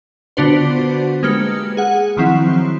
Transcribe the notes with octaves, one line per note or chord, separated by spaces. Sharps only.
D3 B3 D4 F4 F#4 C5
G#3 A#3 G4 B4 F6 C#7
G#4 F#5
D#3 F3 F#3 C4 E4